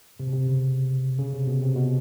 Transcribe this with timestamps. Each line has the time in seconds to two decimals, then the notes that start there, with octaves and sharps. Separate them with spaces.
0.20 C3
0.27 B2
0.34 C3
0.47 C#3
1.19 C#3
1.34 C3
1.47 B2
1.62 C3
1.76 B2